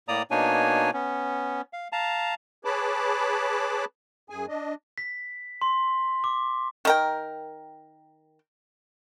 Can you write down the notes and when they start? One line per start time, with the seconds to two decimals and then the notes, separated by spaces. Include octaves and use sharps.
0.08 A2 A#3 D5 A#5 D#6
0.31 B2 A#3 D4 D#4 C#5 G#5
0.93 B3 C#4
1.73 F5
1.92 F5 A5 A#5
2.65 G#4 B4 C#5 A5 B5 D6
4.30 F#2 G#4 G#5
4.48 D4 D#5
4.98 B6
5.62 C6
6.24 D6
6.85 D#3 A#4 G5